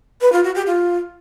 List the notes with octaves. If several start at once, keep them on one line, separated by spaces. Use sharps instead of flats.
B4
F4
F#4
G4
F4